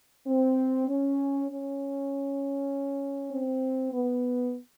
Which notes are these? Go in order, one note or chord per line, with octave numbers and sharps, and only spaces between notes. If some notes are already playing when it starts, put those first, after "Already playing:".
C4
C#4
C#4
C4
B3